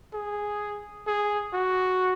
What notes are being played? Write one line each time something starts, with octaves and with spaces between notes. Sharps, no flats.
G#4
G#4
F#4